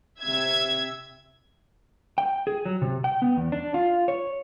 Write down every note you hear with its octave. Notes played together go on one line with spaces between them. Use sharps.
C3 E5 G#6
G5
G#4
F#3
C3
G5
B3
E2
D4
F4
C#5